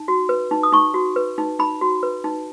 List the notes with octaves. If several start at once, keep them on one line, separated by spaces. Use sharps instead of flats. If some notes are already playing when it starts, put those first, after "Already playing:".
Already playing: D#4
F#4
B4
D#4
D#6
D#4 C#6
F#4
B4
D#4
D#4 B5
F#4
B4
D#4